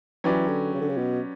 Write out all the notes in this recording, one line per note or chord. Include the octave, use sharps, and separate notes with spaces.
E3 F#3 C#4 G4 B4 D5
D3
C#3
D3
C#3
B2